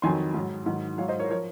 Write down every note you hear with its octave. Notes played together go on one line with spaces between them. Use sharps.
F2 D#3 F#3 G#5 C6
G#2 F#3
G#2 D#3 F#3
G#2 F#3 C#5 F5
C5 D#5
A#4 C#5
F3 A#4 C#5